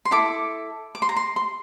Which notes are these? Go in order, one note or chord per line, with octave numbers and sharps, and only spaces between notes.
C6
E4 A4 D6
D6
C6
A#5
C6
C6